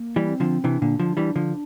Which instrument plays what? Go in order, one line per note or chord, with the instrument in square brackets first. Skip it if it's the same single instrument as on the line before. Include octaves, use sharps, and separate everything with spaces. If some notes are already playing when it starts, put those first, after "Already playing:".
Already playing: [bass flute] A#3
[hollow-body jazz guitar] E3 G3
[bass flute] C4
[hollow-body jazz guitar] D3 F3
[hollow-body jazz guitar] C3 E3 [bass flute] D4
[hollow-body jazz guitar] A#2 D3
D3 F3
E3 G3
D3 F3